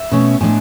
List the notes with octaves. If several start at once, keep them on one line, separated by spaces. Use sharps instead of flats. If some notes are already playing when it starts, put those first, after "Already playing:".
Already playing: E5
B2 A3 C#4
A2 G#3 D4 G#5